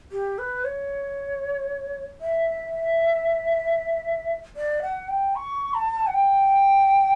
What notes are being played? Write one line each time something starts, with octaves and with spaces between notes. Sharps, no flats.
G4
B4
C#5
E5
D5
F#5
G5
C#6
A5
F#5
G5